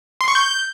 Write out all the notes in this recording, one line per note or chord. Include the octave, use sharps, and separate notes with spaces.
C6
C#6
G6